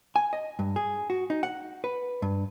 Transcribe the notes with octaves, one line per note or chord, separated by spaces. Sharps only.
G#5
D#5
G2
G#4
F#4
D#4
F#5
B4
G2